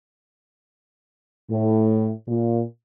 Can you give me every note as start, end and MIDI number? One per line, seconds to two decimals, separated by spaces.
1.50 2.10 45
2.27 2.61 46